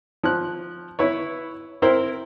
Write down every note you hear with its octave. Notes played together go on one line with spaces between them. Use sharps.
F3 F#6
E4 B4 C#5
C4 E4 A#4 C5